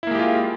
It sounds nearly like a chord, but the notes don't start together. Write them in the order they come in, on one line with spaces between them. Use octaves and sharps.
E4 A#3 G#3 G4 F4